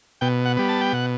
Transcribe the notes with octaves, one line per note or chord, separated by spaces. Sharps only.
B2 G5
F#5
G3 B3
A5
G5
B2 F#5